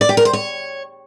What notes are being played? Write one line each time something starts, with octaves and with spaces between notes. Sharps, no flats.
D5
G4
A#4
C5
C#5